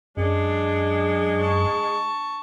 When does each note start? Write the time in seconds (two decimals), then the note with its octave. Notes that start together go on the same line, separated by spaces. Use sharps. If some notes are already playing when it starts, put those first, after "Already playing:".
0.17 F#2 G#3 D4
1.40 A5 C#6